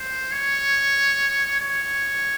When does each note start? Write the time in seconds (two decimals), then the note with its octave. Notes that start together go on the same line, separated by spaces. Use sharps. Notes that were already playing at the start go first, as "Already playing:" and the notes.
Already playing: C5
0.32 C#5
1.61 C#5